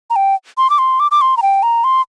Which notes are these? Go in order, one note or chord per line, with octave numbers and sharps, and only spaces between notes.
A#5
G5
C6
D6
C6
D6
D6
C6
A#5
G5
A#5
C6